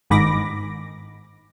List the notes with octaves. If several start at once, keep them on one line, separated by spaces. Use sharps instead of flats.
G1 G#2 D#3 B5 D6 A#6